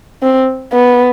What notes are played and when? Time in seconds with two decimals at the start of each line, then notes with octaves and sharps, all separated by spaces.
0.23 C4
0.73 B3